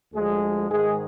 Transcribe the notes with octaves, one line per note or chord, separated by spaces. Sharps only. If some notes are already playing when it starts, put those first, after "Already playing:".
D2 D3 F3 G#3 G#4
G#2 D#3 G#3 G#4